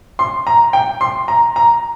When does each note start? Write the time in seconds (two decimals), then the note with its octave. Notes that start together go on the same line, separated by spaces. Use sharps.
0.19 C6
0.47 A#5
0.73 G5
1.01 C6
1.28 A#5
1.56 A#5